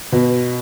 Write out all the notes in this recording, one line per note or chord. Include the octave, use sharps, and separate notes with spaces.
B2